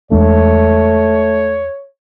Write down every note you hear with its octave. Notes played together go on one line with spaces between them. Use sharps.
E2 G#3 A3 D4 C#5